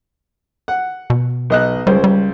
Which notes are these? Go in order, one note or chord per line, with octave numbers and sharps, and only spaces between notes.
F#5
B2
B1 D#5 F#6
C#2 G3 C5
G3